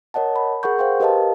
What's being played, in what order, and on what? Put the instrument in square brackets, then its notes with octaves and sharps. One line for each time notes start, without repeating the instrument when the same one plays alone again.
[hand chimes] A#4 C#5 D#5 F#5 A5
B5
G#4 A#4 F#5 C#6 G6
C5 F5 G5 C6
G4 A#4 B4 D#5 F5 A5